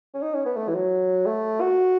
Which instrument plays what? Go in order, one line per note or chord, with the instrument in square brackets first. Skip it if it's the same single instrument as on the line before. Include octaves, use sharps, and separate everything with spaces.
[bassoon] C#4
D#4
C#4
B3
A3
E3
F#3
A3
F#4